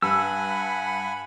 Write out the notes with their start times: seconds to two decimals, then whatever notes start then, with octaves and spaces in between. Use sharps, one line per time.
0.02 G2 F#5 G#5 B5 E6